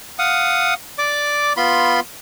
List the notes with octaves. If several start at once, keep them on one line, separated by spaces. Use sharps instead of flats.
F5 F#5 D#6
D5 D6
B3 F4 B5 C6